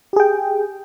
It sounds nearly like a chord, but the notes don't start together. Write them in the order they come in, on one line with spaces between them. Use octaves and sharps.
G4 G#4 G5